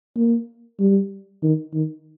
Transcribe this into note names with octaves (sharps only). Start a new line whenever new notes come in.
A#3
G3
D#3
D#3